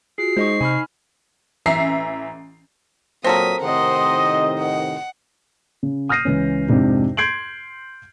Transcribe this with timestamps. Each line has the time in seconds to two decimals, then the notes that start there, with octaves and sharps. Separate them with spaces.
0.18 F4 F#4 G#4 C7
0.37 G#3 D#4 C5 D#5 C#6
0.61 C3 G#5 B5 F6
1.66 A1 E3 E5 A#5 C7
3.24 A#2 F#3 A#3 C4 A4 A#4 D#6 B6
3.62 A2 C3 D#3 C5 D#5 F#5 C6
4.59 F#5
5.83 C#3
6.09 D#6 F6 G6 A#6 C7 D#7
6.25 C#2 E3 C#4
6.67 F2 G#2 C3 D4 D#4
7.17 C6 G6 G#6 C7 D7 F#7